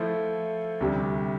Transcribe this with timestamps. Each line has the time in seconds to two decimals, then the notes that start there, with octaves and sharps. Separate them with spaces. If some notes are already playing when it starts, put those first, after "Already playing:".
Already playing: F3 A3 E4 A4 C5
0.81 D2 C3 G3 D4